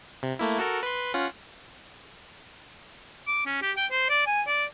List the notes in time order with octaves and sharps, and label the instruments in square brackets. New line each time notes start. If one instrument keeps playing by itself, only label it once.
[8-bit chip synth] C3
A3 A#3 E4
F#4 A4 A#4
B4 C6
C#4 F4 F#5
[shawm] D6
C#4
G4
G5
C5
D5
G#5
D5